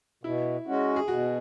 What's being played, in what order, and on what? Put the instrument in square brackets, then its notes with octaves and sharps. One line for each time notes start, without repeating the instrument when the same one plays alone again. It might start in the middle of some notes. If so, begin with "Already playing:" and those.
[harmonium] B2 [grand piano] E4
[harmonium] G#3 C#4 F#4
[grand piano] G#4
[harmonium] B2 [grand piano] F#4